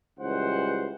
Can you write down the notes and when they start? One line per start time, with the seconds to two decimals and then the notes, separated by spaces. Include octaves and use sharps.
0.19 C#2 E3 G3 C5 F#5